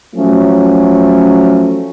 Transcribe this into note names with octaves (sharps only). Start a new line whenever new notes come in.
F3 F#3 A3 C#4